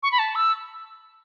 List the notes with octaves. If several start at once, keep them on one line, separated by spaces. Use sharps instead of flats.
C#6
B5
A5
E6